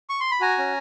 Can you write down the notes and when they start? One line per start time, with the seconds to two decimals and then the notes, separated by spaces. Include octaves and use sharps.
0.10 C#6
0.20 C6
0.31 B5
0.41 F#4 G#5 A#5
0.58 C#4